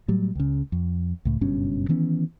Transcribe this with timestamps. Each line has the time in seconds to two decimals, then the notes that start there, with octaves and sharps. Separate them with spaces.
0.08 A2 F#3 G3
0.35 C#2 C#3
0.72 F2
1.25 C#2 A2
1.41 F#1 G2 B2 C#4
1.89 D#3 E3 B3 C#4